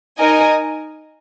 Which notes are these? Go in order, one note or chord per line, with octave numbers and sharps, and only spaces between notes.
D#4 A#4 D#5 G#5